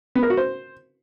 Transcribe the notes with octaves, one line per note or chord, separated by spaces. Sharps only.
B3
A#4
F#4
C5